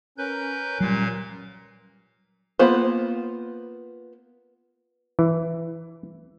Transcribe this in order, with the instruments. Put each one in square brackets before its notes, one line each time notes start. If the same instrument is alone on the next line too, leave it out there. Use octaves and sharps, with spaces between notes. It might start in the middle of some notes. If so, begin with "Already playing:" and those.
[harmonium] C#4 A#4 [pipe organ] B4 G6
[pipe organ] A#2 F5 [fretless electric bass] F#3 G3
[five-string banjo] A#3 B3 F4 C5
[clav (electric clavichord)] E3